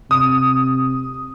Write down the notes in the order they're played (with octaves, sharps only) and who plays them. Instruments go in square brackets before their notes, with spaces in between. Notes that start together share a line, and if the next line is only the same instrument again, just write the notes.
[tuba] C3 [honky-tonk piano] D#6